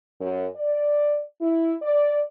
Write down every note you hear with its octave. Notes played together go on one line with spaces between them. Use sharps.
F#2
D5
E4
D5